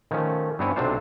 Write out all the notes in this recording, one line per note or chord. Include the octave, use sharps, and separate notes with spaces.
D#3 F3 A3 C#4
G2 B3 C4 E4 C#5 G#5
B1 C3 F#3 D4 F4 C5